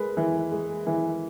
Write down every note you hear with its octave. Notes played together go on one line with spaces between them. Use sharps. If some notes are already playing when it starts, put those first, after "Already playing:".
Already playing: G#3 A#4 B4
E3
G#3
E3